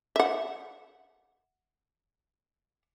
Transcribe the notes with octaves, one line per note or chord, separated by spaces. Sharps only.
E5 F#5